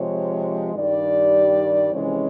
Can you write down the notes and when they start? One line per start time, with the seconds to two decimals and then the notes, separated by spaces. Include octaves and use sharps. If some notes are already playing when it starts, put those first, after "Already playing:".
Already playing: C3 F3 G#3 C#5
0.73 G2 D#3 G3 D5
1.91 F2 C3 E3 G#3 C#4 C#5